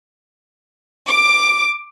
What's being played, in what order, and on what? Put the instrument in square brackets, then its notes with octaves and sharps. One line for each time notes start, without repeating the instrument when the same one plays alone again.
[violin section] D6